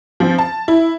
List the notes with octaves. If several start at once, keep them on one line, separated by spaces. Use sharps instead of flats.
F3 C4
A5
E4